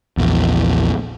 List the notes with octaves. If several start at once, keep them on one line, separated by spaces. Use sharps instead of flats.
A#1 E2